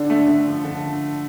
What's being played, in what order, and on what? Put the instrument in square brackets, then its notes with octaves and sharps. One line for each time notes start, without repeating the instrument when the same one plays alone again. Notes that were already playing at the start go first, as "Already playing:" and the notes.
Already playing: [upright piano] D3 [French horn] D4
[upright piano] A3
D3
F3
D3